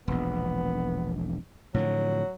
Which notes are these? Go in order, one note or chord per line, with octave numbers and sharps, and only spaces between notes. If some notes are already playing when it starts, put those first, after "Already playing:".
E1 A#1 B3
A2 D3 F3 F#3